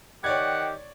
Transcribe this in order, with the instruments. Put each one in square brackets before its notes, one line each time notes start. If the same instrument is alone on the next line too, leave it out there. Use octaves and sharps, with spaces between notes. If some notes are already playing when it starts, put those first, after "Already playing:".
[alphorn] D#3 [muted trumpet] G4 [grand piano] C#5 D5 G#6 [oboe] F#5